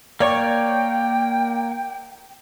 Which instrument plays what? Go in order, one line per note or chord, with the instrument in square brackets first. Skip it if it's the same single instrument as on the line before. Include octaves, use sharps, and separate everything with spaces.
[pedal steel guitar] A#3 C#5 C#6 [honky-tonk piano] D5 [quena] G5